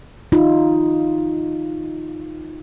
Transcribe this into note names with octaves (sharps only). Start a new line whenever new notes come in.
D#4 F4